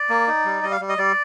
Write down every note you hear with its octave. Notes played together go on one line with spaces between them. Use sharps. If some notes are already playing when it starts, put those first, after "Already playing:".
Already playing: D5
A#3
D#4
G3
G3 D#5
F5
G3
D#5
G3 D5